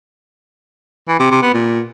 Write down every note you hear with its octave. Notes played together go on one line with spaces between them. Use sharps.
E3
C3
C3
B3
A#2